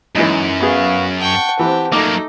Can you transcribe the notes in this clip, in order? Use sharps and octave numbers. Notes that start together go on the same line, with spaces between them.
F#2 E3 G#3 D#4
B3 F#4 G#4 B4 F5
F#5 G5 A5 C#6
E3 C4 G4
F#3 A3 A#3 D#4 D6